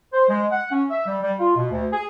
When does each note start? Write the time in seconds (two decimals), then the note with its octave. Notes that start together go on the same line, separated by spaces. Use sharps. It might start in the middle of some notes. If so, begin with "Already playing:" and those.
0.13 C5
0.29 G#3
0.51 F#5
0.71 C#4
0.91 E5
1.07 G3
1.22 G3
1.39 F4
1.56 B2
1.71 D2
1.93 G#4